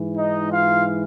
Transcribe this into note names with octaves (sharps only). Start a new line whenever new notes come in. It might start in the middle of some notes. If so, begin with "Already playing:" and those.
Already playing: G#2 E3
D#4 D#5
F4 F5